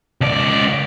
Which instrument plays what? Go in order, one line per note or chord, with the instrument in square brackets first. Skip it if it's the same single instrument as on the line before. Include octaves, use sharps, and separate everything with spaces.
[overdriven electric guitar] C#2 D5